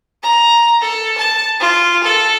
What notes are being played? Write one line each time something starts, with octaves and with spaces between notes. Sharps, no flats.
A#5
A4
A5
F4
A4